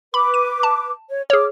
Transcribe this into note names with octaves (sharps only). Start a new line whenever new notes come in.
B4 B5 D6
D#7
A5
C#5
G#4 C#5 D6 F6